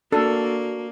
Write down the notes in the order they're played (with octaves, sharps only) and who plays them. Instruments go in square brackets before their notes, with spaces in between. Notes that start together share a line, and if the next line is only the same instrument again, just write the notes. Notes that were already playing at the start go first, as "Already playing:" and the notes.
[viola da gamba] A#3 [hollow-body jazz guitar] D4 [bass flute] F#4 [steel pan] A4